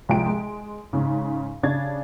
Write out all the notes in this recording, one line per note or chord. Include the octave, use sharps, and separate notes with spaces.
C2 F3 G#3 G5 D7
G#3
G#2 C#3
C#3 D4 G#6 A6